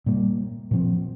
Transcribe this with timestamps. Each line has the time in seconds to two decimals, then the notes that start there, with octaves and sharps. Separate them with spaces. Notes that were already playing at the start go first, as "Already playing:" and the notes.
0.06 A#2 G3 A#3
0.71 A#2 F3 C4